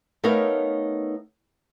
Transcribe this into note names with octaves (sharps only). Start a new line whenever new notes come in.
A3 B3 D#4 A#4 C#5 F5